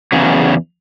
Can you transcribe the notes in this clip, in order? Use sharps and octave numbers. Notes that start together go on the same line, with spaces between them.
E2 C#3 F#3